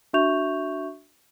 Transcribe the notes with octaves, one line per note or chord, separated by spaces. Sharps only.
D4 F#4 E5 C#6 G6 F7